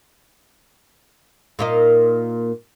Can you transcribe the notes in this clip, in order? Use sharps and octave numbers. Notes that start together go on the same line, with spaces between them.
A#2 A#3 D#4